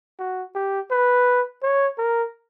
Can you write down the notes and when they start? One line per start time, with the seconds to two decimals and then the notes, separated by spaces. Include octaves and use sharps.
0.19 F#4
0.55 G4
0.91 B4
1.63 C#5
1.98 A#4